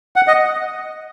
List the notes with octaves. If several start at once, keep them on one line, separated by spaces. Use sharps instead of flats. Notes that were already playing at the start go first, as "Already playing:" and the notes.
F#5
D#5